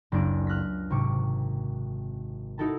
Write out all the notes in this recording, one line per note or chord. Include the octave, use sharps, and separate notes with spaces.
F#1 C#2 D4 D7
F6 F#6 A#6 B6
G#1 C3 C#6 D6
D#4 E4 F#4 A4 A#4 A5